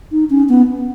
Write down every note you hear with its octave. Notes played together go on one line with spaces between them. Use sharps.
D#4
C#4
B3